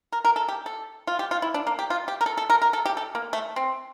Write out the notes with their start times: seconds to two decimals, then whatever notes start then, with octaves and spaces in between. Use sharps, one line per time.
0.12 A#4
0.25 A#4
0.36 A4
0.48 G4
0.66 A4
1.07 F4
1.19 G4
1.31 F4
1.42 E4
1.54 D4
1.67 A#3
1.79 G4
1.90 F4
2.08 G4
2.21 A#4
2.26 A4
2.37 A4
2.50 A#4
2.62 A#4
2.73 A4
2.86 G4
2.97 A4
3.15 A#3
3.33 A3
3.56 C4